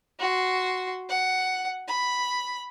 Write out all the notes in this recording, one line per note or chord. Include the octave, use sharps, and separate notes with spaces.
F#4 C6
F#5
B5